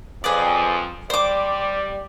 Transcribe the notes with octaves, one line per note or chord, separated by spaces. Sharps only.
F2 G#4 B4 D5
G3 C5 D5 D6